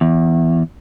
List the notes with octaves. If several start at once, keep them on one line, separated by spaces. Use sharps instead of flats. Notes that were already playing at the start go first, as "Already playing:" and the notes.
E2